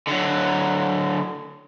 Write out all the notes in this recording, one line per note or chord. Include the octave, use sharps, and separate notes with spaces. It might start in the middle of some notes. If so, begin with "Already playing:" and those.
D3 F#3